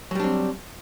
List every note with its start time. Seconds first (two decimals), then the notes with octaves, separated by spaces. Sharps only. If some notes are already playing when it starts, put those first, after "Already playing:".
0.11 F#3
0.15 G3
0.20 D4
0.24 C4